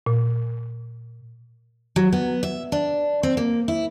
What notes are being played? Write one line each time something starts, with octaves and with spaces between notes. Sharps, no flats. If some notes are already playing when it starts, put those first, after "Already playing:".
A#2
F#3
B3
E5
D4
C4
A#3
E4